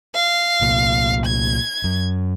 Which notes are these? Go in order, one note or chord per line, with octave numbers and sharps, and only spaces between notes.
F5
C2 A#2
G#6
F#2